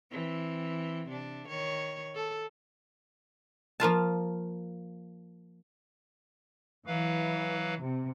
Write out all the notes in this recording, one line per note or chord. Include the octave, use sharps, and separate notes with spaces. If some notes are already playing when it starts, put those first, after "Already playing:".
E3 C4
C3 D4
D#3 C#5
A4
F3 A#3 F4 A5
E3 F#3 B4 F5
C3